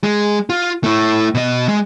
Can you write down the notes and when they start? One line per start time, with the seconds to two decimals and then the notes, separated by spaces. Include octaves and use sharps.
0.04 G#3
0.50 F4
0.84 A3 E4
1.35 B2 D#5
1.68 G#3